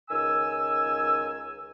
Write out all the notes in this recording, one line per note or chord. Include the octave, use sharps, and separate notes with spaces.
C#2 D#3 G#5 E6